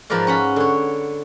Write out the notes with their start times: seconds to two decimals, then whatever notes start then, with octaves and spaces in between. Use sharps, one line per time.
0.10 G#2 F3 A#4 B4 D5 F5
0.27 C#4 F#5 B5
0.56 D3 C#5